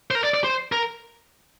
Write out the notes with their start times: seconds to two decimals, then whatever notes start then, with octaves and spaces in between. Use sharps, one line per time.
0.11 C5
0.15 A#4
0.24 D5
0.34 D5
0.44 C5
0.72 A#4